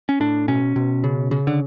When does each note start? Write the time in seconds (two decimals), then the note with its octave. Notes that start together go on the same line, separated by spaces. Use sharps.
0.09 C#4
0.20 A2 D4
0.48 B2 C#4
0.76 B2
1.04 C#3
1.31 C#3
1.47 D3